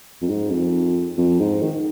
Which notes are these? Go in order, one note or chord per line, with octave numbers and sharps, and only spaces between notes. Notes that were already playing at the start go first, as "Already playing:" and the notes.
F2
G#2
F2
F2
G#2
D#3